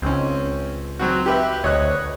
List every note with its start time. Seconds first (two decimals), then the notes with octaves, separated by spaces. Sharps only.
0.02 C#2 C4 C#4
0.99 F#3 C4 F#4
1.26 G4 B4 E5
1.64 D2 C#5 D#5 F#6